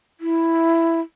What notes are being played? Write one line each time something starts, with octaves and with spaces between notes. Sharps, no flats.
E4